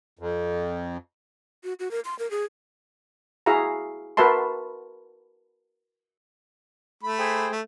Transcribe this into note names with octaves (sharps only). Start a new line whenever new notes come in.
F2
F#4
F#4
A#4
C6
A#4
G#4
E4 F#4 G#4 E5 F5 A#5
F#4 A#4 B4 E5 A5 C6
A3 B5
G#4 C5 G5
A3